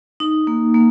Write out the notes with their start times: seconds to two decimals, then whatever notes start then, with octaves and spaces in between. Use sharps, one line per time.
0.20 D#4
0.47 A#3
0.74 A#3